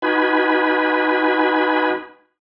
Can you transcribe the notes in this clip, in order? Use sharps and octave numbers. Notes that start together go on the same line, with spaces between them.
D#4 F#4 B4 G#5 B5